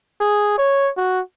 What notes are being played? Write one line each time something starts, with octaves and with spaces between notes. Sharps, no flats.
G#4
C#5
F#4